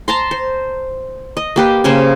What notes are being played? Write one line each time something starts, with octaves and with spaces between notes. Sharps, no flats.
A5 A#5 C6
C5
D#5
A#3 G4 B4
C#3 A#3 C#4 C5